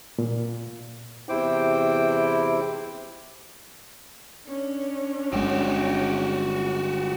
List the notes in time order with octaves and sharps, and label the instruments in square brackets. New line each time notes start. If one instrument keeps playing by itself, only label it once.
[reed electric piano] A#2
[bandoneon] E2 C3 E4 C5 G5 D6
[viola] C#4 D4
[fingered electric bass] G1 G#3 [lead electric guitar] F#4 G4